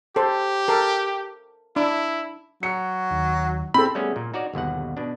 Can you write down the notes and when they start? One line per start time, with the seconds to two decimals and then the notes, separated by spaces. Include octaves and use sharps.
0.16 G4 A4 C5
0.68 A4 A#4
1.76 D4 E4
2.63 F#3 C#7
3.11 D#2 D#3
3.74 C4 A4 B5
3.95 G3 A3 B3 C#4 G#4
4.16 A#2
4.34 D#4 F#4 C#5 D5
4.54 G1 D#2 B2 F#5
4.97 B2 D4